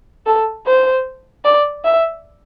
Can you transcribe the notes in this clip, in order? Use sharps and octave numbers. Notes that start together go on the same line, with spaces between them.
A4
C5
D5
E5